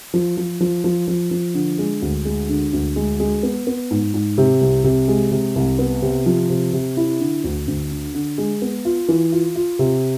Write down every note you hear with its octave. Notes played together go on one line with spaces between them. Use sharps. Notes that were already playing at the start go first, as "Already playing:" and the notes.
F3
F3
F3
F3
F3
F3
D3
G#3
D2
G#3
D3
D2
G#3
G#3
B3
B3
G#2
G#2
C3
C2
C3
G#3
C3
C2
B3
C3
F3
C3
C3
E4
D3
D2
D2
D3
D3
G#3
B3
F4
E3
F4
F4
C3